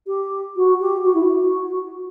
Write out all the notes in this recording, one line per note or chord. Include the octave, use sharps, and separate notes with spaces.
G4
F#4
G4
F#4
E4
F#4